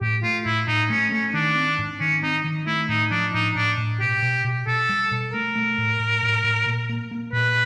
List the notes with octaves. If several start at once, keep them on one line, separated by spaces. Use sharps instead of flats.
A2 G4
A3 F4
A2 E4
A2 D#4
A3 C#4
A3 C#4
D#3 D4
C4
G#2
D#3 C#4
C4 D#4
D#3
A3 E4
A2 D#4
F3 D4
A2 D#4
A2 D4
A2
B2 G4
B2
B2
B2 A4
G3
B2
A3 A#4
A3
A2
A2
A2
A2
A#2
A#3
A#3
A#2 B4